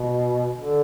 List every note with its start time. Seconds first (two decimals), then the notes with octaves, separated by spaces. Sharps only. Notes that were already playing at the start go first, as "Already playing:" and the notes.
Already playing: B2
0.58 D3